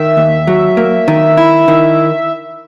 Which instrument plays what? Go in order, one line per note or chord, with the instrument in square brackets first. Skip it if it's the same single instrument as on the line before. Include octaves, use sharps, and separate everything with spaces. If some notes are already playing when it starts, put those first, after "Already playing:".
Already playing: [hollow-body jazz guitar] D#3 [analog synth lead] E5
[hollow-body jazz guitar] D#2
F#3
A#3
D#3
E4
D#3